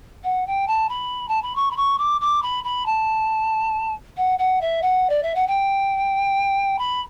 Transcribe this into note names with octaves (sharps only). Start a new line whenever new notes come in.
F#5
G5
A5
B5
A5
B5
C#6
B5
C#6
D6
D6
B5
B5
A5
F#5
F#5
E5
F#5
D5
E5
F#5
G5
B5